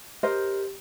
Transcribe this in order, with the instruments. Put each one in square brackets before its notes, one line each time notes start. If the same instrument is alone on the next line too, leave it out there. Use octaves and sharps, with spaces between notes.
[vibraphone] G4 [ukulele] A#4 C5 D#5